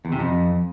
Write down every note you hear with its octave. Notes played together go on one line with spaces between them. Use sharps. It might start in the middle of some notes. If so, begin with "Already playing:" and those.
E2
C3
F2